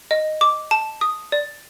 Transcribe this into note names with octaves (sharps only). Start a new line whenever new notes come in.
D#5
D6
A5
D#6
D5